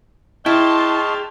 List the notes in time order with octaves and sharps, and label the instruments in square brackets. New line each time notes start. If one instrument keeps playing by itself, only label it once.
[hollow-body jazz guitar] E4 [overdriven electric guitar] G#4 G5 [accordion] D#5 C#6 F6 [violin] A5 C6